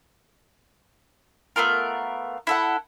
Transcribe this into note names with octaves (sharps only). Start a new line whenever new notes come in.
A3 B3 F4 A#4
E4 A4 F#5